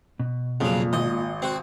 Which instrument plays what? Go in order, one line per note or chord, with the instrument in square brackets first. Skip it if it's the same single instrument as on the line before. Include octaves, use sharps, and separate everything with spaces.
[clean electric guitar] B2
[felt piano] F2 [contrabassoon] A#2 [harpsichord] C#3 F#3
[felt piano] G#1 [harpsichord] D#5
[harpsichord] C4 F#4